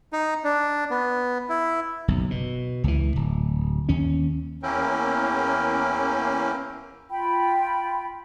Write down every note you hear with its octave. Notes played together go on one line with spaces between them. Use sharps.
D#4
D4
B3
E4
F#1 B1
B2
C#2 E3
D1
D#2 C#4
E2 A#3 C#4 E4 A#4 G5
F4 G5 B5